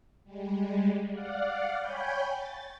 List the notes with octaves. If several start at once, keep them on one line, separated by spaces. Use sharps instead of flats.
G3 G#3
D5 F5 F#5
C#5 G5 G#5 B5 G6
A6